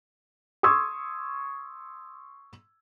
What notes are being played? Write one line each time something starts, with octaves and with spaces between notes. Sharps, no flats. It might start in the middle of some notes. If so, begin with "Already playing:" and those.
C6 C#6 D#6 E6 G#6